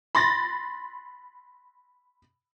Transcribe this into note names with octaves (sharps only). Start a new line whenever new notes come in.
B5 C6 A6 A#6